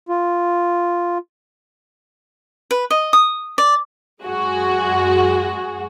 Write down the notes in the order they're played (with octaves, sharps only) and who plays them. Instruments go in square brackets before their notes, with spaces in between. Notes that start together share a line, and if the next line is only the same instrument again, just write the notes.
[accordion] F4
[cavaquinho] B4
D#5
D#6
D5
[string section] F#2 G#3 F#4 G#4